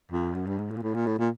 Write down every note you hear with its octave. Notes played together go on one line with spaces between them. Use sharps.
F2
F#2
G2
G#2
A2
A#2
A2
A#2
A2
A#2